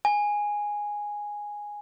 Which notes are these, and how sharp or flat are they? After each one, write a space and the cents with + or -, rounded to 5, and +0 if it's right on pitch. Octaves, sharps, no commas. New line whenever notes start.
G#5 -5